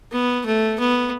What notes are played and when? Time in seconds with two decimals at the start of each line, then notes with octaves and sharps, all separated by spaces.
0.12 B3
0.46 A3
0.80 B3